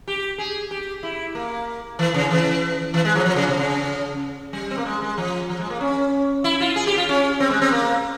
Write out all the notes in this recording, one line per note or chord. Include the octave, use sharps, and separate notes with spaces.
G4
G#4
G4
E4
A#3
E3
C#3
E3
E3
G#3
F3
F3
C#3
C3
C#3
G3
C4
A#3
G#3
G#3
F3
F3
G#3
A#3
C#4
E4
F4
G#4
G4
F4
C#4
C4
G#3
C4
A#3